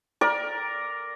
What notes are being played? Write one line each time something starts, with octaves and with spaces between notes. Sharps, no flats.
A#4 D5